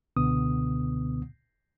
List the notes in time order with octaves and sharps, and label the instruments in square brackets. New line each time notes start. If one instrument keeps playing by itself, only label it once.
[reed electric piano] C#2 B2 D3 B3 D#6